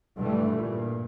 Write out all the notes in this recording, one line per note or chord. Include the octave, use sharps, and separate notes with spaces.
G2 D3 E3 G3 A3
G2 A#2